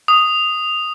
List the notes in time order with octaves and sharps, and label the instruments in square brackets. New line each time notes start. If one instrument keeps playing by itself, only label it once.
[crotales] D#6